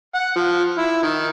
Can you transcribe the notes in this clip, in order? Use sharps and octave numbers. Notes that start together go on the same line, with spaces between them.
F#5
F3
E4
D#3